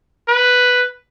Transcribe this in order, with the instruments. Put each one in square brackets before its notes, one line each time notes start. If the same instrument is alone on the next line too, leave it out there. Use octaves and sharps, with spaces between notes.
[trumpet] B4